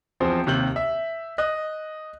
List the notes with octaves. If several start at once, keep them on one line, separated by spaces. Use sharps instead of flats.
E2 F3 C4
D#2 C3 G6 F#7
E5
D#5 F#6